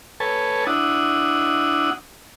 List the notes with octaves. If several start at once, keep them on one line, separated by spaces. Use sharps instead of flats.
A4 B4 C#5 G#5 A5
D4 E4 F#5 D#6